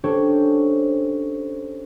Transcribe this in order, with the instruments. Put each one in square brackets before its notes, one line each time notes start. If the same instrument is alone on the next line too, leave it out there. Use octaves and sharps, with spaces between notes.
[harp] C#4 D4 G4 A4 C5 C#5